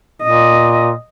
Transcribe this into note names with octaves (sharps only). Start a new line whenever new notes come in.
A#2 D#5